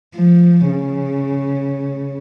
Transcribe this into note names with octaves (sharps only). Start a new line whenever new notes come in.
F3
C#3